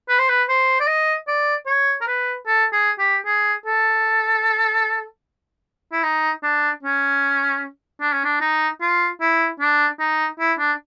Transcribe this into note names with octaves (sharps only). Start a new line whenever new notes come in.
B4
C5
B4
C5
D5
D#5
D5
C#5
A#4
B4
A4
G#4
G4
G#4
A4
E4
D#4
D4
C#4
D4
C#4
D4
D#4
F4
E4
D4
D#4
E4
D4